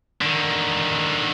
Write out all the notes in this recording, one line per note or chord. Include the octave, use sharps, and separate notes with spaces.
D3 D#3